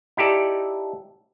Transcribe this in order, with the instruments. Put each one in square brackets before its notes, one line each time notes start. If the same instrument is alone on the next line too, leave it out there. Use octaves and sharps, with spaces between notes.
[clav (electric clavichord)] D#4 E4 G4 A4 D5